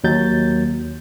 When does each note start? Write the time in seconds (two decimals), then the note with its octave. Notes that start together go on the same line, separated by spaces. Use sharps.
0.04 D#2 F#3 G6 A6